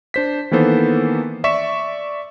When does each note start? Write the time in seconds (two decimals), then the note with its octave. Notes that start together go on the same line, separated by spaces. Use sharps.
0.14 D4 C5 B6
0.51 D#3 E3 A#3 B3 A4 C5
1.44 D5 E5 C#6 B6 E7